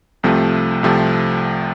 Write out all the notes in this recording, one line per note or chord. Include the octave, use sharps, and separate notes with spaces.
C2 C3 F3 A3
C2 C3 F3 A3